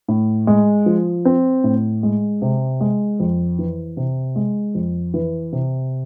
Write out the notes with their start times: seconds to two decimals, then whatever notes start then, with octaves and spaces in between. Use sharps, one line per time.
0.08 A2
0.47 G#3
0.86 F3
1.25 C4
1.64 A2
2.03 G#3
2.42 C3
2.81 G#3
3.20 F2
3.59 E3
3.97 C3
4.36 G#3
4.75 F2
5.14 E3
5.52 C3